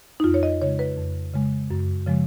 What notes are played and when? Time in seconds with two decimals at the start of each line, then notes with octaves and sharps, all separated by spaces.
0.20 D#4
0.24 F2 F4
0.34 C#5
0.43 D#5
0.62 C#3 G#3 C#5
0.79 B4
0.97 F2
1.33 C#3 G#3
1.71 F#2
2.06 C#3 F3 G#3